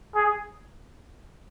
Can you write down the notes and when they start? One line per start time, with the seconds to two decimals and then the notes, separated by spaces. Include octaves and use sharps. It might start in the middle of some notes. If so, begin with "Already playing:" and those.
0.15 G#4